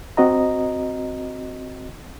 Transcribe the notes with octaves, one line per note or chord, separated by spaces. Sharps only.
C4 F#4 D#5 A#5